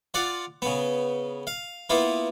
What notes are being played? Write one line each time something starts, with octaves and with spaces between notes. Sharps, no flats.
F4 D5 F#5
C#3 B3
F5
A#3 B3 E4 F4